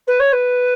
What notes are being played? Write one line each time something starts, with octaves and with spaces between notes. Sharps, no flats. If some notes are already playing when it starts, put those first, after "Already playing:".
B4
C#5
B4